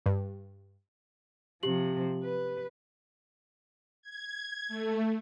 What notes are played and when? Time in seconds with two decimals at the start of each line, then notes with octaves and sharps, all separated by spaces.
0.06 G2
1.63 C3 F3 G4 F#7
2.24 B4
4.02 G#6
4.68 A3